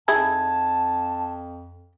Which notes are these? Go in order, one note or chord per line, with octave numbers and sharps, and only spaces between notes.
F2 D#4 E4 G#4 A5 G#6